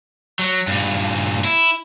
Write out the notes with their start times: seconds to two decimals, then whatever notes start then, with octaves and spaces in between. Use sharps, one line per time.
0.39 F#3
0.67 G2 A#2
1.44 E4